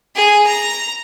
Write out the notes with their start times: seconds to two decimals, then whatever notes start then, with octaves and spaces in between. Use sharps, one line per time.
0.15 G#4
0.46 A#5